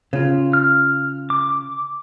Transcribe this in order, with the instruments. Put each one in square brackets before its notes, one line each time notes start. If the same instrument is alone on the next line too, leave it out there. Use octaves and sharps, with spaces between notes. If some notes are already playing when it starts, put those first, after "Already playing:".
[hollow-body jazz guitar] C#3 F4
[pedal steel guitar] F6
D6